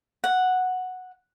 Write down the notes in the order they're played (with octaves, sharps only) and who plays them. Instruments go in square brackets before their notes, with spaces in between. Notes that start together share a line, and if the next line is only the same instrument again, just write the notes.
[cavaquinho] F#5